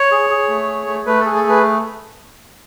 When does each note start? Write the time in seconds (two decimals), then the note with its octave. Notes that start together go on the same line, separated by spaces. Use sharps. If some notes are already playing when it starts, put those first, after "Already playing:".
Already playing: C#5
0.11 G#4
0.30 G#4
0.49 A3
0.68 G#4
0.87 A3
1.06 A3 B4
1.20 A4
1.25 G#4
1.35 A4
1.44 A3 B4